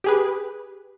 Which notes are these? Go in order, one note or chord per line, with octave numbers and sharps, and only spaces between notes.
G4 G#4 B4